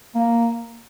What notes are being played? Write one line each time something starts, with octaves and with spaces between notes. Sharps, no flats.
A#3